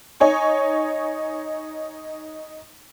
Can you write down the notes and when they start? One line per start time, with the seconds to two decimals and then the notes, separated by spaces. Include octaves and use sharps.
0.20 D#4 C#5 G#5 C#6